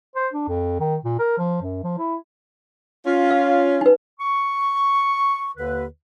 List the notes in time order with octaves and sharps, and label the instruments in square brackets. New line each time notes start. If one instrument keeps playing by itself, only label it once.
[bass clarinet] C5
D4
F2
D#3
A#2
A#4
F3
F#2
F3
E4
[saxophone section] C#4 F4
[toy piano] F5
D#4 B4
[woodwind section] C#6
D#2 D3 B4